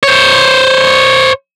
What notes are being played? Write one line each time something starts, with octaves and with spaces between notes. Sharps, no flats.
C5 C#5